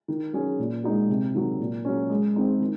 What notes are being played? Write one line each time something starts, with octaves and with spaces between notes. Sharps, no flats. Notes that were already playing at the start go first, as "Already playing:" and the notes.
D#3
F#3 C#4 G#4
A#2
G#3 D#4 F#4
C3
D#3 F#3
A#2
F#3 C#4
G#3
C4 D#4
D#3